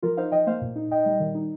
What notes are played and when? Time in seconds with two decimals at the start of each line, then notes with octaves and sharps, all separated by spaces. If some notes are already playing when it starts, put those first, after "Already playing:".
0.02 F3 F4 A#4
0.17 D#4 C5 F5
0.32 F3 D#5 G5
0.47 A#3 C5 F5
0.62 A#2
0.76 D#4
0.90 A#2 D#5 G5
1.06 G3
1.20 D#3
1.35 D#4